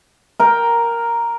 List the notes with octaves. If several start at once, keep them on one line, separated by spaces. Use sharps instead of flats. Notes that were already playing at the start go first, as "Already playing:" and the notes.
A#4 G5